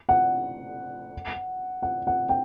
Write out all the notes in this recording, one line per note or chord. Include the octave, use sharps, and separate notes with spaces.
F#5
F#5
F#5
G5